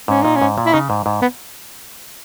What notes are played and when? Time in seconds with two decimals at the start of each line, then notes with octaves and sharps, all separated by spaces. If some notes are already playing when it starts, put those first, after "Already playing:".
0.08 G#2 C#4
0.22 A#2 D#4
0.36 C#4
0.42 G#2
0.58 A#2
0.66 E4
0.73 C#3 D#4
0.90 G#2
1.06 G#2
1.22 B3